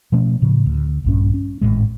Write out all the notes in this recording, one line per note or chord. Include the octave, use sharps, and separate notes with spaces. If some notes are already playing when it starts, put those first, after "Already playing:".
B2 F3 A3 C#4
A2 C#3 F3
D2
A#1 G2 C#4
C#4
G#1 F#2 A2 G#3